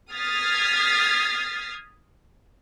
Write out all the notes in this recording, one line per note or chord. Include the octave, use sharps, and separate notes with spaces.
D#6 F6 G#6 A6 B6 C7